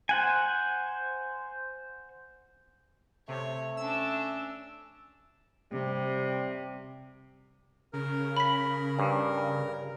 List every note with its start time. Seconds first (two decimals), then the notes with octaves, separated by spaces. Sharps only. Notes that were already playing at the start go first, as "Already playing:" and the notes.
0.09 C5 F#5 G#5
3.28 C3 A3 C#5
3.77 C#4 D4 A5 E6
5.72 C3 G3
7.93 C#3 A#4
8.37 B5 B6
8.99 G2